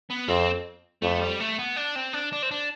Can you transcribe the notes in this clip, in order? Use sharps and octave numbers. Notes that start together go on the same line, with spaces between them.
B3
F2 C4
F2 A3
G3
A3
B3
D4
C4
D4
D4
C4
D4